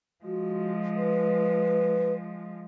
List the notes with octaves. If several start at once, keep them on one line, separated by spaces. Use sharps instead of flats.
F3 G#3 F#4
B4